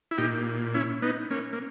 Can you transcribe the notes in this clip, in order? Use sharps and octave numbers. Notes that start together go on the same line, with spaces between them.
E4
A#2 D#4 G4
C#4 E4
B3 D#4
A#3 C#4
A#3